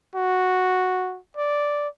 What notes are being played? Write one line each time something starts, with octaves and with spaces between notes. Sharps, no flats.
F#4
D5